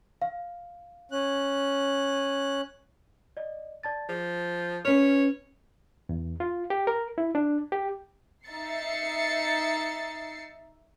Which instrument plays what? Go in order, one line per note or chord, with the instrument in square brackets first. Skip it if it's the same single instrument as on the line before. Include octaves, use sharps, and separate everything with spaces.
[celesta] F5
[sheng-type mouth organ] C#4 F#6
[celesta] D5 D#5
D5 A5 A6
[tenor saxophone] F3 [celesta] G#4
[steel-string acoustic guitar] C#4 B4 [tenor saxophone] C#5 [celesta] F6 B6 C#7
[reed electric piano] E2
F4
G4
A#4
E4
D4
G4
[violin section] D#4 E5 A6 C7 C#7